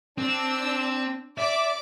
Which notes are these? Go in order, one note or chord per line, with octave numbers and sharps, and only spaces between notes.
C4 D4 E6
D5 E5 D6